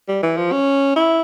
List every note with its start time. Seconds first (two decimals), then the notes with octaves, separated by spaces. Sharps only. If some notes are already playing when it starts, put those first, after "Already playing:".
0.08 G3
0.23 E3
0.37 F3
0.52 C#4
0.96 E4